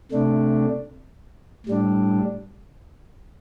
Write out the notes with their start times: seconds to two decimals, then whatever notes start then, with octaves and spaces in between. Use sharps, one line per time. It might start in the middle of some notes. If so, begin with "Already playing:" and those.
0.12 C3 A3 D4
1.66 A2 G3 D4